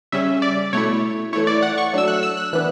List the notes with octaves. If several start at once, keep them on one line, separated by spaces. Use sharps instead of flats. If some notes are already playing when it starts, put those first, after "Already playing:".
C#3 G3 C#4 E5
D5
B2 A3 E4 C#5
E3 A3 E4 C#5
D5
F#5
C#6
F#3 A3 D4 E6
F#6
E6
F#6
E3 B3 D4 F#6